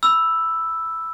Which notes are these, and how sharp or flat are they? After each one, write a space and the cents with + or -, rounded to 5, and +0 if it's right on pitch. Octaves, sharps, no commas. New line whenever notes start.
B5 +0 E6 +0